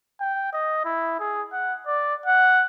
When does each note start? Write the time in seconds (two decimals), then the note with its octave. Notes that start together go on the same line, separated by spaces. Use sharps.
0.20 G5
0.53 D#5
0.85 E4
1.20 G#4
1.52 F#5
1.87 D5
2.26 F#5